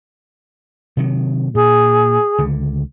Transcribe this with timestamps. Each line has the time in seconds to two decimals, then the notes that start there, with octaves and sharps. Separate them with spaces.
0.97 C3 D#3 F#3
1.55 A#2 G#4
2.38 C#2 D3